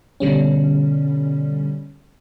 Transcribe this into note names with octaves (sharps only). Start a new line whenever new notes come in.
B2 D3 G3 C#4